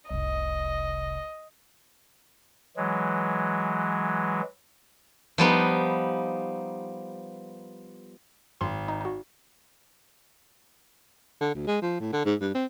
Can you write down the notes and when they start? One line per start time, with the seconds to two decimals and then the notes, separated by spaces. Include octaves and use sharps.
0.10 F1 C2 D#5
2.77 E3 F#3 G#3
5.38 F3 G3 B3 D#4
8.61 G#1 C6
8.88 D#4
9.01 D#4 F#4
11.41 D3
11.55 D2
11.67 G#3
11.82 F3
12.00 A2
12.13 D3
12.25 G#2
12.41 G2
12.55 C4